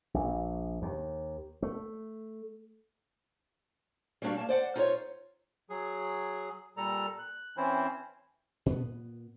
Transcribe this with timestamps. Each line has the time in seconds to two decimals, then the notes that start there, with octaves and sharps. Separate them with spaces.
0.14 A#1
0.82 D#2
1.62 A3
4.22 G3 A#3 B3 D4 F#4 F5
4.37 A#3 F5 A5
4.49 C5 D5 F#5
4.76 D#4 F4 G4 C5 C#5
5.70 F#3 G#4
6.77 A#2 G3 A4 A#5
7.19 F#6
7.57 E3 C4 C#4 E4 C5
8.66 A#2 B3